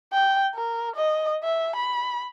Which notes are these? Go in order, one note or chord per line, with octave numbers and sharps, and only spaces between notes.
G5
A#4
D#5
E5
B5